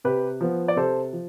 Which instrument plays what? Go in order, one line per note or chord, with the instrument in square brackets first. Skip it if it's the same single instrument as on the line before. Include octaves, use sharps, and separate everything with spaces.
[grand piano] C3 G4 B4
F3 B3
D5
C3 A4 C5
F3